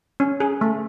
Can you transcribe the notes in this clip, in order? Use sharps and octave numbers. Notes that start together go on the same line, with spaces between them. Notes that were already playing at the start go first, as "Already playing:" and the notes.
C#4
G#4
A3